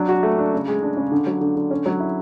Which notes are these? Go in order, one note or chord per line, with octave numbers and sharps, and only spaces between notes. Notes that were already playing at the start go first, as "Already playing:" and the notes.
Already playing: F#3 D4
F#4
A3
D4
C#3
G#3
D4
C#3
D3
F#3
D3
D3
C#4
F#3
E4